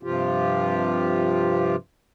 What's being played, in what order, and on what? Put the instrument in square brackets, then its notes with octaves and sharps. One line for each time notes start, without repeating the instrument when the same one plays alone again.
[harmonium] G2 C3 F3 F4 G4